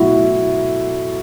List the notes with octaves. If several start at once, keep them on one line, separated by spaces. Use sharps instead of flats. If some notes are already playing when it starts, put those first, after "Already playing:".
Already playing: B2 F#3 A3 E4 F#4